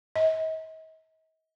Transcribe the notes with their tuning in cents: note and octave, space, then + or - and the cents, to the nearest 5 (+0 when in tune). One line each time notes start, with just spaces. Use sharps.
D#5 +45